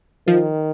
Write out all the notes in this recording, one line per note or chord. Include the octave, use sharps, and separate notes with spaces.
D#3 F3